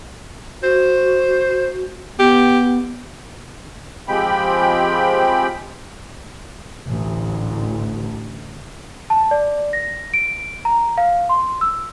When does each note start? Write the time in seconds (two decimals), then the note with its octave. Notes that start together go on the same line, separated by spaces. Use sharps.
0.63 F#4 C5
2.19 B3 G4
4.08 F3 G#3 C4 G4 G5 B5
6.85 A1 D2
9.10 A5
9.31 D5
9.73 A#6
10.14 D7
10.65 A#5
10.98 F5
11.29 C6
11.61 E6